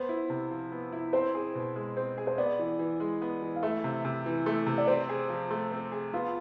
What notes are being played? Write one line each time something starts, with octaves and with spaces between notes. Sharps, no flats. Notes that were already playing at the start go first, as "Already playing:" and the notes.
Already playing: B3 C5
E4
C3
F3
B3
E4
C4 C5
G#4
B2
G#3
C4
G#4
C5
B3 D5
E3
E3
G#3
B3
E3
F5
A3 E5
C3
C3
E3
A3
C3
D5
C4 C5
G#4
F3
A3
C4
G#4
B3 F4